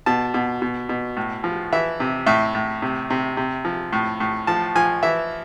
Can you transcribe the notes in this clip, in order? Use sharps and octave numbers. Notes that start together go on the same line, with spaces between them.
B2 A5
B2
B2
B2
A2
F3
E3 E5
C3
A2 E5
A2
C3
C3
C3
F3
A2
A2
F3 A5
F3 G#5
E3 E5